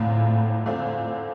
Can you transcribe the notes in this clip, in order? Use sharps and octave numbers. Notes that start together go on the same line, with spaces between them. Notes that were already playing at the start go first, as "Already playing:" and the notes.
Already playing: E2 A2 D3 A3 C4 F4
E2 A2 D3 A3 C4 F4